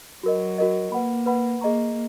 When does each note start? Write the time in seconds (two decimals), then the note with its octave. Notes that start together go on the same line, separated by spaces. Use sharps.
0.23 F#3 F#4 A#4 D#5
0.58 F#4 A#4 D#5
0.92 A#3 B4 F#5 B5
1.26 B4 F#5 B5
1.61 A#3 G#4 D#5 A#5 C#6